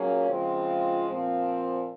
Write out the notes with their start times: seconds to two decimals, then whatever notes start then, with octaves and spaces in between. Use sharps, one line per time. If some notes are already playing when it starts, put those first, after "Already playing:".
Already playing: A#2 F#3 A#3 C#4 G#4
0.29 C#3 F3 G#3 C4 F4
1.08 A#2 F3 C4